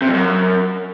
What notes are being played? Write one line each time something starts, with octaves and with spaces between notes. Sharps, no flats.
C3
F2
F#2